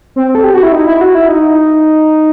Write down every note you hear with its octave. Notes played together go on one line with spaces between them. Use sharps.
C4
A4
G4
F#4
E4
D#4
E4
F#4
E4
D#4